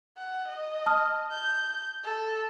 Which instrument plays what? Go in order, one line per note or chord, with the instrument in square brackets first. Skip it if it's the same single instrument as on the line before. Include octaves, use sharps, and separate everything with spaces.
[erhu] F#5
D#5
[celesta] A5 D#6 F6
[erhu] G6
A4